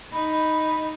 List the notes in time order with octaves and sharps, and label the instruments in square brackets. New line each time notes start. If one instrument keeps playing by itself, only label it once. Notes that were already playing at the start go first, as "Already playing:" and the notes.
[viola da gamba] D#4 [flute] B5